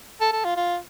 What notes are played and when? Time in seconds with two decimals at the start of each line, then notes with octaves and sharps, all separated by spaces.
0.21 A4
0.33 A4
0.45 F4
0.56 F4